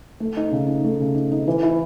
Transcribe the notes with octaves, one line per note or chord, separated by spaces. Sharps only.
A3
D#4
C#3
D#4
A3
C#3
D#4
D#4
E3
E4